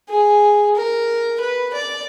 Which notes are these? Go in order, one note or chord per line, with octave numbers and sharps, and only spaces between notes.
G#4
A#4
B4
D5